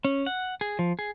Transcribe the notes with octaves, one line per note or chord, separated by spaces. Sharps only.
C#4
F#5
G#4
F3
G#4